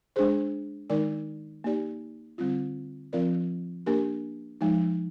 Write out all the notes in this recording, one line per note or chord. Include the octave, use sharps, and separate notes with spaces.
G#3 D4 G#4 C5
D#3 G#3 D#4 A#4 D5
A#3 D#4 G4 D5
D3 G3 C4 F4
F3 C4 F4 A#4 D5
A#3 D4 G4 A#4
F3 G#3 D#4